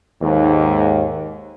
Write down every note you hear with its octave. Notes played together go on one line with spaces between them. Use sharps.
D#2 G#2